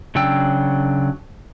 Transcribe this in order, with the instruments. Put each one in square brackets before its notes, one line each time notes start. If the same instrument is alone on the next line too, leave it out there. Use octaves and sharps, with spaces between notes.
[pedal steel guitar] C#3 F#3 D4 G5 E6